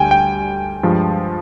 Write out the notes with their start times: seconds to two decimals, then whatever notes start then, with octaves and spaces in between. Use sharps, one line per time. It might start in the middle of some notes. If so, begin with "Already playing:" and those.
Already playing: D2 D3 G3 G5 G#5
0.11 G5
0.83 G2 F3 G#3